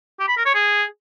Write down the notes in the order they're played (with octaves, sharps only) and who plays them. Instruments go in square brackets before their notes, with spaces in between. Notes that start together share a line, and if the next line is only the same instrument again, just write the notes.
[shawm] G4
B5
A#4
C#5
G#4